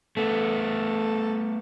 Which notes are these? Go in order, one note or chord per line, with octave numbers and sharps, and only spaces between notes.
A3 B3 A4